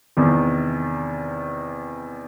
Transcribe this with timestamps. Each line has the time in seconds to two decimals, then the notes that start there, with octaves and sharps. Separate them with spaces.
0.17 E2 C3 D#3